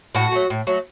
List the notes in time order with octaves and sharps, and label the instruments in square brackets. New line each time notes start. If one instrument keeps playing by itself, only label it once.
[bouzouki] A2 F#4
F#3 A3
A2
F#3 A3